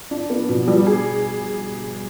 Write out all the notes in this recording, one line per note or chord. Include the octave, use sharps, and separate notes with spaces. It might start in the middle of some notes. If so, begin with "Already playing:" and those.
D4
B3
B2
G3
G#4